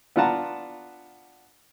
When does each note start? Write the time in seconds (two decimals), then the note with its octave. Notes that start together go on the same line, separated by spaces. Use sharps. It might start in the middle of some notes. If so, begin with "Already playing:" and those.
0.16 B3 D4 F4 F#5 A5 A#5